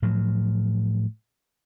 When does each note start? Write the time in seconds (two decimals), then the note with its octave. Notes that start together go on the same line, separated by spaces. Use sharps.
0.02 A2 F3 F#3